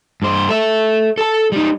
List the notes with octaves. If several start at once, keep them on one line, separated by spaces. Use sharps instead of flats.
G2 C5
A4 E5
A4 A5
G3 D#4